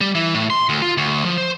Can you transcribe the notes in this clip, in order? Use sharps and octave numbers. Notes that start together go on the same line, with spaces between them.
G3
E3
A2
C6
D2
F4
D2
F3
C5